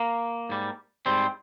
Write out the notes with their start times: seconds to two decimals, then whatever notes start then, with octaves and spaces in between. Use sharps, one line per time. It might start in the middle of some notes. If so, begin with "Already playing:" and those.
Already playing: A#3
0.49 G#2 G3
1.06 G#2 G3 C4